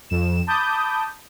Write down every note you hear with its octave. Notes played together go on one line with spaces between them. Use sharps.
F2 E7
A5 B5 D6 D#6 G6